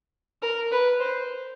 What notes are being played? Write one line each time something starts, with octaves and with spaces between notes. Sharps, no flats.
A#4
B4
C5